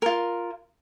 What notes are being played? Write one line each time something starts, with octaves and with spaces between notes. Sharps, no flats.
F4 A#4